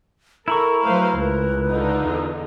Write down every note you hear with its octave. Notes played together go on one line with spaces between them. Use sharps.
E4 A4 A#4 A#5 B5 C#6
F#3 A3 B4 C5 F5
C#2 A#4 B4
D3 D#4 F4
E2